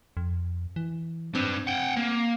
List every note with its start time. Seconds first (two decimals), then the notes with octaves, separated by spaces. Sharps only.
0.17 F2
0.76 E3
1.35 C4 D4 B4
1.67 F#5 G5
1.97 A#3